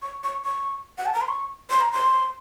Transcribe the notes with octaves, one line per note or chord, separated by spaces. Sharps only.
C#6
C#6
C#6
F#5
A5
A#5
C6
C#6
C6
A#5
C6